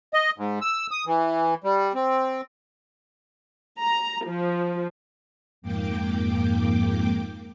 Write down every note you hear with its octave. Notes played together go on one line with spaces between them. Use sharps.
D#5
G#2
E6
D#6
E3
G3
C4
A#5
F3
F2 G#2 A#3 G5 D6